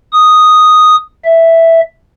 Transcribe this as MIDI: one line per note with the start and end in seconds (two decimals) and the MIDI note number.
0.13 0.96 87
1.25 1.80 76